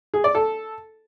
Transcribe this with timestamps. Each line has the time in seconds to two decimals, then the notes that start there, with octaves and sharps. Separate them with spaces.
0.14 G#4
0.24 D5
0.35 A4